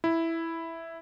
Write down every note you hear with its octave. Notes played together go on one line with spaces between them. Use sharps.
E4